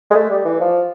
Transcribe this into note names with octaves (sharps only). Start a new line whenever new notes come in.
G#3
A3
G3
E3
F3